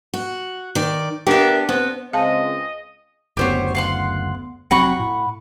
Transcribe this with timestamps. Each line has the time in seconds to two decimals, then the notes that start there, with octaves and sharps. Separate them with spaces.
0.14 F#4
0.75 D#3 D5
1.27 B3 D4 G4 A#4 E5
1.69 B3 C4
2.13 C#2 G#3 C4 D#5 F5 A5
3.37 F#1 D2 B3 G4 C5 C#5
3.75 F5 F#5 C6
4.71 F1 F#3 C4 F#5 B5 C#6
4.99 A2